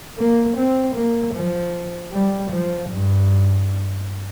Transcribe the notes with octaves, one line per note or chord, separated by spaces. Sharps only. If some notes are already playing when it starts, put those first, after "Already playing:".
A#3
C4
A#3
F3
G3
F3
G2